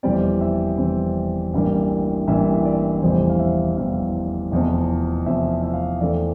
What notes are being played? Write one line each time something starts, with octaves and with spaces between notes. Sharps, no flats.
F1 E2 E3 G3 C4 D5
E5
F1 E2 E3 G3 C4
A1 G2 E3 G3 A#3
A1 G2 E3 G3 A#3 E5
D5
F1 E2 E3 G3 C5
F5
E5
F1 E2 E3 G3 F5
F1 E2 C3 F3
F1 E2 C3 F3 E5
E5
F5
E5
E2 E3 A3 C4 D5